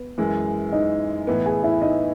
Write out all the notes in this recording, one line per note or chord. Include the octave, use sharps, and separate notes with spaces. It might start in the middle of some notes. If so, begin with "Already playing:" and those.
Already playing: B3 B4
F#2 E3 G#3
D#4 D#5
A2 E3 B3
G#4 G#5
E4 E5
D#4 D#5